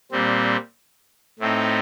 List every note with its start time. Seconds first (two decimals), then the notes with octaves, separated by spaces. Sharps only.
0.12 A#2 G3 C4
1.39 A2 A3 C4 D#4